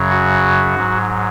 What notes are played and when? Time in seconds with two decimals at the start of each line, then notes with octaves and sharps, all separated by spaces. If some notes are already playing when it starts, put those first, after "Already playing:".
Already playing: F#2 C#3 F#3
0.10 F#4
0.75 G#2 F#3